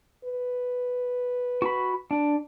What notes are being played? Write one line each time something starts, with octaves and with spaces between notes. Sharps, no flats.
B4
F#4 B5
D4